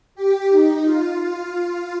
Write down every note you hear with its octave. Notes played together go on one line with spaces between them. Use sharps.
G4
D#4
F4
F4